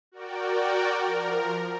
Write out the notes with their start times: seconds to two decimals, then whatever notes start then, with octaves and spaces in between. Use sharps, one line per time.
0.12 F#4 A#4 D5 G5
1.03 F3 A#4